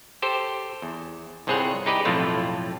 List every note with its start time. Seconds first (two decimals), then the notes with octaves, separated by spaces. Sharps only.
0.22 G4 A4 C5
0.82 E2
1.47 G1 C2 C4 G#4 C#5 F#5
1.86 D#4 E4 G4 B4 D5 D#5
2.05 B1 F2 A2 A3 F4